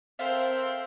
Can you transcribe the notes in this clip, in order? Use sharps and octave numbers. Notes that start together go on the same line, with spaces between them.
C4 A4 A#4 C5 E5 F5